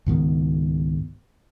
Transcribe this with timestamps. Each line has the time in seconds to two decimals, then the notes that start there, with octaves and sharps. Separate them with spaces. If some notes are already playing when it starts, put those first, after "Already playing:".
0.06 C#2 G#2 D#3 B3